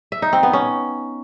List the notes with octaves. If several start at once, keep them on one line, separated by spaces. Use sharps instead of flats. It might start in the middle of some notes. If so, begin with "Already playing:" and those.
E5
D#4
C4
B3
C#4